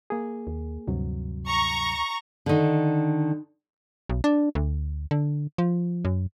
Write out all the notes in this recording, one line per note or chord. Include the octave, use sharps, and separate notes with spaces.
A#3 G#4
D#2
D2 G2 C3 F#3
A#5 C#6
D3 D#3
B1
D4
D2
D3
F3
F#2